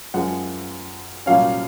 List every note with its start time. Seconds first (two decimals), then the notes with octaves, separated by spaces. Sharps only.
0.14 F#2 F3 G#3 F#5
1.26 C2 A#2 F#3 C#4 F5